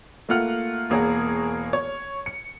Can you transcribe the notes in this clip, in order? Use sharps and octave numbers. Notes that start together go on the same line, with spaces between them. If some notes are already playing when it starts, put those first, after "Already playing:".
A3 A#3 F4 F#5 F6
E1 A#3 G#4 A#4 C#5 F#5
C#5
C#7